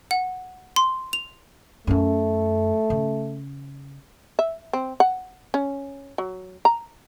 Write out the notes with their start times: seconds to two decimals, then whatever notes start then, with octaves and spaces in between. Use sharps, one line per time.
0.11 F#5
0.76 C6
1.13 F7
1.87 F#2 A3 E4
2.90 C#3
4.39 E5
4.73 C4
5.00 F#5
5.54 C#4
6.18 F#3
6.65 A#5